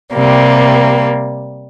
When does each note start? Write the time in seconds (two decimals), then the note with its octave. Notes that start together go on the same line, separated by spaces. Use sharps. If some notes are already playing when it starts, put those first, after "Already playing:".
0.13 C3 G3 A#3